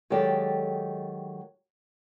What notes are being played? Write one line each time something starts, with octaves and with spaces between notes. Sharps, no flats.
D#3 F#3 G#3 G4 A4 D5